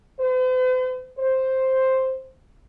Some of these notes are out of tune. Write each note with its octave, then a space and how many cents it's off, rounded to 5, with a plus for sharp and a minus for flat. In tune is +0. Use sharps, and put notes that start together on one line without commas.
C5 -45
C5 +5